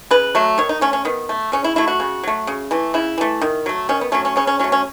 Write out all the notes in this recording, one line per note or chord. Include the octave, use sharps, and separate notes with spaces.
C#3 B4
F#3 A3
D#3 C#5
D#4
A3 C#4
C#4
D#3 B3
A3
C#3 C#4
E4
F#3 A3 E4
F#4
C#3
F#3 A3
C#3
E3 A3
C#3 E4
E3 A3
D#3
F#3 A3
D#3 C#4
B3
F#3 A3 C#4
C#4
C#3 C#4
C#4
F#3 A3 C#4
C#4